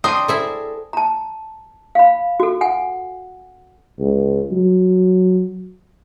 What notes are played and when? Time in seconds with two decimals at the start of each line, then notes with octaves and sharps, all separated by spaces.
0.04 C4 D4 A#4 C5 D#6 D#7
0.28 E4 G#4 A4 C5 E5
0.93 A5 A#5
1.95 F5 B5
2.40 F#4 A4
2.61 F#5 G#5
3.99 C#2
4.52 F#3